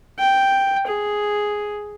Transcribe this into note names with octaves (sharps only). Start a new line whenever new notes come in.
G5
G#4